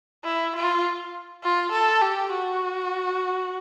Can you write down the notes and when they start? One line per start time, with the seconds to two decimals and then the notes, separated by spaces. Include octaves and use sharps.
0.25 E4
0.55 F4
1.43 F4
1.72 A4
2.01 G4
2.32 F#4